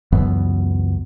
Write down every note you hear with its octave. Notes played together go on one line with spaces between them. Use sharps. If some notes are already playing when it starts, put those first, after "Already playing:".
C#2 F#2 E3 B3